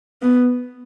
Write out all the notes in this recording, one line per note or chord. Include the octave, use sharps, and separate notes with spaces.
B3